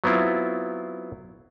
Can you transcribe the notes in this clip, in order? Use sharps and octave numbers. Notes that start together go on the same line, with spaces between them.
F#3 B3 C4 E4 F4